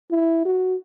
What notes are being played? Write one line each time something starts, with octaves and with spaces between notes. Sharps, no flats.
E4
F#4